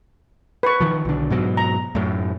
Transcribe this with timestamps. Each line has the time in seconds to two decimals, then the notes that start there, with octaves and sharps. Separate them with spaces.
0.63 B4 C#6
0.80 D#3 F3
1.05 B1 D3
1.30 G#2 B2 F#3
1.57 A#5
1.95 F#2 A2